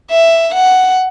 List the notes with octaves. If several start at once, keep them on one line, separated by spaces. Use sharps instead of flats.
E5
F#5